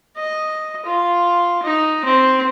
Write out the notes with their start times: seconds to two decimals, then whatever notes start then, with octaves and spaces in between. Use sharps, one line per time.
0.17 D#5
0.86 F4
1.63 D#4
2.05 C4